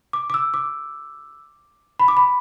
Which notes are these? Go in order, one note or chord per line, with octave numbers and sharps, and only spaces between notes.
D6
D6
E6
D6
B5
D6
B5